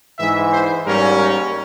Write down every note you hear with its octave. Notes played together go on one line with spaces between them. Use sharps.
G#2 E3 G#3 E5
C5
G#2 G3 A#3 C#4 A#4
A#4